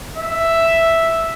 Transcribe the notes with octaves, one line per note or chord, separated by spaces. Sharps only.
E5